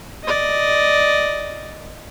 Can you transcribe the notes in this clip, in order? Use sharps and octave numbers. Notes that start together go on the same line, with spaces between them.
D5 D#5